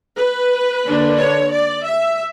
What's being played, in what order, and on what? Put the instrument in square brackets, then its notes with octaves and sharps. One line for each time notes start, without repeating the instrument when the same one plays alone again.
[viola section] B4
D3 A#3 D4
C#5
D5
E5